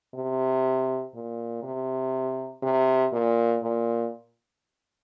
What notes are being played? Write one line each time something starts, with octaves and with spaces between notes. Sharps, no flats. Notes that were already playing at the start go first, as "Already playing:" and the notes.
C3
A#2
C3
C3
A#2
A#2